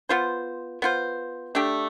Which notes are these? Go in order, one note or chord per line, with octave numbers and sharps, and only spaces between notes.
B3 F4 C5
B3 F4 C5
A3 D4 G4